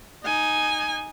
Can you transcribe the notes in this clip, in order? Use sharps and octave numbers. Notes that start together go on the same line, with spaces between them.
D#4 G#5